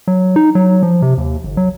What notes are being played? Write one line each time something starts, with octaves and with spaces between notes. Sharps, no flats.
F#3
D#4
F#3
F3
C3
D#2
G1
F#3